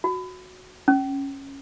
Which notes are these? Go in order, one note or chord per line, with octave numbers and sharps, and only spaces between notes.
F#4
C#4